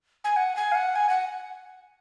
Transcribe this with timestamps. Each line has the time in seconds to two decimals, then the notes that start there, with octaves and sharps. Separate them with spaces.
0.24 G#5
0.36 F#5
0.56 G#5
0.72 F5
0.75 F#5
0.96 G#5
1.09 F#5